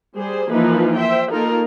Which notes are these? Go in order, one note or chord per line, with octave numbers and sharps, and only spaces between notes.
G3 G#4 C5
E3 F3 A#3 D#4 F4 B4
C5 E5 G5
A#3 D#4 F4 A4 A#4